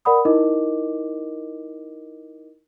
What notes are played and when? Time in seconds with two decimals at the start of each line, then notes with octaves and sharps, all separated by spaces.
0.05 A#4 D5 F#5 B5 D#6
0.25 D#4 E4 A#4 D#5 D6